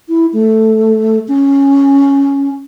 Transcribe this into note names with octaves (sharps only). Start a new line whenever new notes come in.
E4
A3
C#4